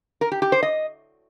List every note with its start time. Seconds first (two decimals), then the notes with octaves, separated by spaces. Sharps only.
0.21 A#4
0.32 G4
0.42 G4
0.52 C5
0.63 D#5